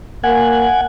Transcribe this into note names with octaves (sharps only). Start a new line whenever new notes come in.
A#3 F#5 G#5